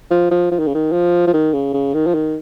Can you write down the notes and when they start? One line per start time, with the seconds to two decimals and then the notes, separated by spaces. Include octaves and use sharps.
0.11 F3
0.31 F3
0.52 F3
0.59 D#3
0.67 C#3
0.75 D#3
0.92 F3
1.27 F3
1.33 D#3
1.53 C#3
1.74 C#3
1.94 D#3
2.07 F3
2.14 D#3